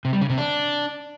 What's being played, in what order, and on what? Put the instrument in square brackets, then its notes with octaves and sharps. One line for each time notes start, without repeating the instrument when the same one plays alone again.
[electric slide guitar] C3
G3
C#3
C3
D4